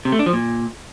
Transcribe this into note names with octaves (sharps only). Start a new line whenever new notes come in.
C3
A3
D4
F3
A#2